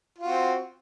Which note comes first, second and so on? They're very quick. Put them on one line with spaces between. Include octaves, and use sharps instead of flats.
F4 F#4 C4